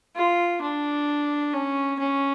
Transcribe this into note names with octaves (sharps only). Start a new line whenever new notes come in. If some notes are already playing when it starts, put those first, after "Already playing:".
F4
D4
C#4
C#4